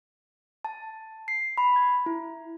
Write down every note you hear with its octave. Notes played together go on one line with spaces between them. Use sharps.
A5
C7
B5
G#6
E4